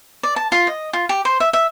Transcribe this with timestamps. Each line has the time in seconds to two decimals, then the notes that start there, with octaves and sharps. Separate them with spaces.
0.23 D5
0.36 A5
0.52 F4
0.67 D#5
0.93 F4
1.09 G4
1.25 C5
1.40 E5
1.53 E5